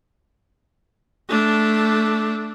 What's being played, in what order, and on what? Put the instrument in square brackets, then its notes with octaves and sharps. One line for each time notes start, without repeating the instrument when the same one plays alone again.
[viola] A3 D4